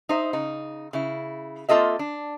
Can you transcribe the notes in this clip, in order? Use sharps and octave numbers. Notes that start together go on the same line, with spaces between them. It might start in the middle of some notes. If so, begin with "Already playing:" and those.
D#4 C5 E5
C#3 D#4
C#3 E4
A#3 C4 F4 A4 D#5 E5
D4